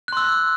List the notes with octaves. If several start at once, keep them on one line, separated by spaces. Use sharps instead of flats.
C6 E6 F#6